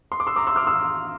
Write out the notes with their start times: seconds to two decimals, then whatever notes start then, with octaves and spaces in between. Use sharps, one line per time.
0.12 C6
0.20 D6
0.27 C6 E6
0.36 A#5 D6
0.47 C6 E6
0.56 D6 F6
0.67 C6 E6